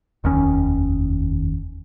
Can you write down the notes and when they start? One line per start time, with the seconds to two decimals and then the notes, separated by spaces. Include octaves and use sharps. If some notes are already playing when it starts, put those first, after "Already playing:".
0.24 F1 D#2 D#3 C#4